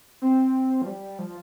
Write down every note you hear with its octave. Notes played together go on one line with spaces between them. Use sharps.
C4
F3
G3
F3